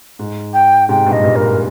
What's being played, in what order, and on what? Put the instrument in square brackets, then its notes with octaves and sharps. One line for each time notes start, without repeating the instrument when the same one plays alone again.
[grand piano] G#2
[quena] G5
[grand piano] G#2 C3 [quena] G5
[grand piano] G2 A#2
[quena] D#5
[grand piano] G2 A#2
[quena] A#4
[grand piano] G#2